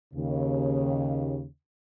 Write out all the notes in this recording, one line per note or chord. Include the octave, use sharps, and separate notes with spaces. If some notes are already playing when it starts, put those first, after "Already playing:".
D#2 C#3